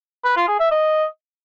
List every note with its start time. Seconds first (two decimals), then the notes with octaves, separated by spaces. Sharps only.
0.25 B4
0.36 F4
0.48 G#4
0.60 E5
0.71 D#5